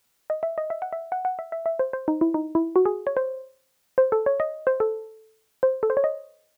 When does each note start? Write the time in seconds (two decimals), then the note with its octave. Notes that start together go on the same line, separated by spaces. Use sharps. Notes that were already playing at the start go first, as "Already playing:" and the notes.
0.30 D#5
0.43 E5
0.58 D#5
0.70 E5
0.82 F#5
0.93 E5
1.12 F#5
1.25 F#5
1.39 E5
1.52 E5
1.66 E5
1.79 C5
1.93 C5
2.08 D#4
2.21 E4
2.34 D#4
2.55 E4
2.76 F#4
2.85 G#4
3.07 C#5
3.17 C5
3.98 C5
4.12 A4
4.26 C#5
4.40 D#5
4.67 C5
4.80 A4
5.63 C5
5.83 A4
5.90 C5
5.97 C#5
6.04 D#5